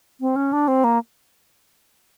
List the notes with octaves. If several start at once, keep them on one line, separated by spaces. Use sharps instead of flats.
C4
C#4
D4
C4
A#3